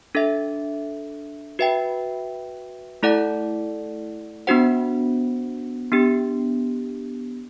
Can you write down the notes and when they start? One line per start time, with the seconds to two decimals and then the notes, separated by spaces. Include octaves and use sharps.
0.15 D4 A4 E5
1.59 F#4 B4 E5 G5
3.03 A3 E4 A4 D5 F#5
4.47 B3 D4 F#4 C5 F#5
5.92 B3 D4 G4